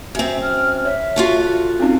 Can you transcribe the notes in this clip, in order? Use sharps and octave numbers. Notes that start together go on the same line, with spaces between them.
F#2 C4 E5
F6
C#5 E5
F4 F#4 A4
C4 C#4 D#4 F5